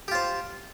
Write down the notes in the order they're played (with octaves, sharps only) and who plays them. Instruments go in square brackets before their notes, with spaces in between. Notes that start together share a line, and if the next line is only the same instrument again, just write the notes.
[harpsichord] G4
F4
C5